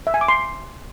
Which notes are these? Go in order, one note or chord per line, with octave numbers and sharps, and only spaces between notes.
E5
G#5
D6
C6